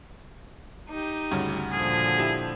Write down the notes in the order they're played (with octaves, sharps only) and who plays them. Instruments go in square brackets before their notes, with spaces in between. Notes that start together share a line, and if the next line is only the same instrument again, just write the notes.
[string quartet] D#4 G4
[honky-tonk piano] D2 G2 C#3
[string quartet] A#2 D3 F3 [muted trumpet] G#4
[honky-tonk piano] E4 G4